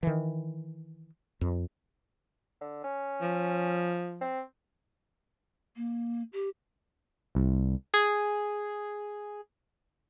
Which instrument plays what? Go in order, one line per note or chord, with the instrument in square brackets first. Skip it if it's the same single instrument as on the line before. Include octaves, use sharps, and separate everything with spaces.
[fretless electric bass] D#3 E3
F2
[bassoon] D3
C#4
[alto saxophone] F3
[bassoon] C4
[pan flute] A#3
G4
[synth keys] C2
G#4